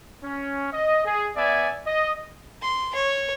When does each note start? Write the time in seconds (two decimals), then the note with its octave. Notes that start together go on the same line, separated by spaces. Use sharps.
0.24 C#4
0.73 D#5
1.05 G#4
1.37 B3 D5 E5 G#5
1.87 D#5
2.62 C6
2.95 C#5